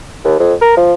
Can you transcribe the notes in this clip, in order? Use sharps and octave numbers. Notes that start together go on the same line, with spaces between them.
D#2
F2
A#4
F3